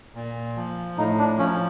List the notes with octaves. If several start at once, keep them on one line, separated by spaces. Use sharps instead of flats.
A#2
F3
A2 D#4
D4
F3 C#4